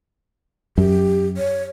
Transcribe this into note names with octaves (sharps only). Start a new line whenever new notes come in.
F#2 G4
C#5